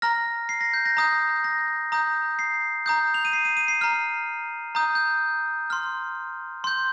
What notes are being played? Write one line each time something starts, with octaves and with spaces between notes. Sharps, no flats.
A#5 F6 A#6
C7
A#6
G6
A#6
A#5 D#6 G6
A#6
A#5 D#6 G6
C7
A#5 D#6 G6
F7
D#7
C7
D#7
D#7
C7
A#5 F6
A#5 D#6 G6
G6
C6 F6
C6 G6